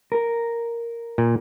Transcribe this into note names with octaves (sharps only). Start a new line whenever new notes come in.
A#4
A#2